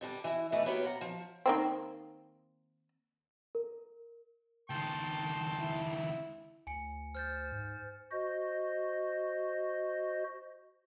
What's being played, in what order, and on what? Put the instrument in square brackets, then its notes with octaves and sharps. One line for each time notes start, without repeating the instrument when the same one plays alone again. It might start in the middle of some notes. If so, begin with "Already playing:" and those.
[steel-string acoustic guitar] G2 D3 G3 A5
E3 E4
E3 A3 D#4 G#4 B4 D5
F#3 A#3 B3 G4 B4 C#5
F#5 A#5
F3
[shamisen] D#3 A#3 C4
[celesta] A#4
[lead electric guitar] C#2 D#3 [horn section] G5 A5 C6
[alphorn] E4
[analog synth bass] D2 [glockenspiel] G#5 C#7
[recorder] C5 [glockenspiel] F6 G6 A6
[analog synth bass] G#2
[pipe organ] F#4 C5 D#5